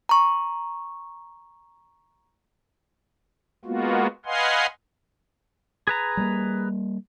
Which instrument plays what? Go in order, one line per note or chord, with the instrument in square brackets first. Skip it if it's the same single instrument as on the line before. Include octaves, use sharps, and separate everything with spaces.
[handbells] A#5 C#6
[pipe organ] G#3 A#3 B3 F4 F#4
B4 D#5 F5 F#5 G#5 C6
[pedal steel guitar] G#4 B4 A#5
[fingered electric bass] G3 G#3 A#3